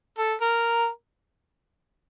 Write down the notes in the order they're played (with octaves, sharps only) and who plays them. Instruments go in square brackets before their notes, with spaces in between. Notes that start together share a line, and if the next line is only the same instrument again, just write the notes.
[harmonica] A4
A#4